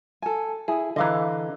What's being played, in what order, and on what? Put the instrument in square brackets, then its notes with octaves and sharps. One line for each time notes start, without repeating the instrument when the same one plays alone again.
[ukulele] A4 G#5
[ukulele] E4 G#5 [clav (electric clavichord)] G#4
[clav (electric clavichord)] D3 E3 [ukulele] D#5 F5 A#5